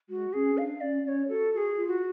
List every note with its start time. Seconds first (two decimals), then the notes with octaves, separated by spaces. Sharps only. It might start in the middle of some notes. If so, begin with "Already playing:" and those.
0.09 G#3 F#4
0.33 C#4 G#4
0.57 D4 F5
0.81 C#4 D5
1.05 C#4 D5
1.08 C#5
1.28 F#4 A4
1.53 F#4 G#4 A4
1.77 F4
1.88 F#4